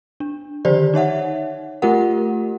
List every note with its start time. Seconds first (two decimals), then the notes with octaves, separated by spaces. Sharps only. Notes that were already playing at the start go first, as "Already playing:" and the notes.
0.20 D4
0.65 D3 D#3 F3 G4 C5 D5
0.94 D#4 C#5 E5 F#5
1.82 A3 F4 G4 A#4 F#5